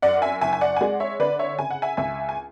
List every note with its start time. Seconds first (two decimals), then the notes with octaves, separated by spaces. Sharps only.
0.02 F#2 D5 F#5
0.22 E5 G#5
0.41 F#1 E5 G#5
0.53 G#5
0.61 D5 F#5
0.77 G#5
0.81 G#3 D5 F#5
1.00 C#5 E5
1.20 D3 B4 D5
1.39 C#5 E5
1.59 C#3 G#5
1.71 F#5
1.82 E5 G#5
1.97 C#2 E5 G#5
2.29 G#5